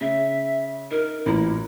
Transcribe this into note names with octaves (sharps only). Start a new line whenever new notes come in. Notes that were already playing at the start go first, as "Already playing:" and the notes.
C#3 E5
D#4 A#4
A1 A#2 E4 A#5